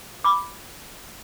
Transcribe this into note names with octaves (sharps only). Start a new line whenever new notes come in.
B5 D6